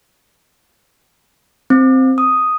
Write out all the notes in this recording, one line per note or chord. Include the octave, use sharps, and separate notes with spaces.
C4
D#6